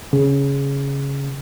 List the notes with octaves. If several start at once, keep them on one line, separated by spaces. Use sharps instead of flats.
C#3